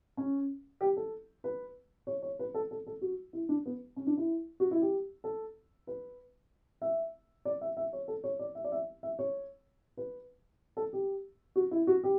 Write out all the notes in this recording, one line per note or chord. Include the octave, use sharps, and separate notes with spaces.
C#4
G4
A4
B4
C#5
C#5
B4
A4
A4
A4
F#4
E4
D4
B3
C#4
D4
E4
F#4
E4
G4
A4
B4
E5
D5
E5
E5
C#5
A4
C#5
D5
E5
D5
E5
E5
C#5
B4
A4
G4
F#4
E4
F#4
G4